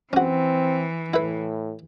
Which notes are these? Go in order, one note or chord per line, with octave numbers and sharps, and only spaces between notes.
E3 C4 C#4 F#4
A2 E4 B4